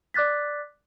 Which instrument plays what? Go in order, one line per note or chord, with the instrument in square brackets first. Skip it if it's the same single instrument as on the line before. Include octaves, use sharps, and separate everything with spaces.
[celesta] D5 D6 F#6 A6 B6